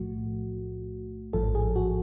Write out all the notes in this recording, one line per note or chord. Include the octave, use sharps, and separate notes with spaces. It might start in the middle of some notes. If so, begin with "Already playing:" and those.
Already playing: B1 A2 F3 A3 F#4
A1 G#2 F3 A4
G#4
F#4